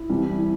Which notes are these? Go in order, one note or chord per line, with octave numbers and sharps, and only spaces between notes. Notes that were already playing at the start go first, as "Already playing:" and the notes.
Already playing: E4
C2 C3 E3 G3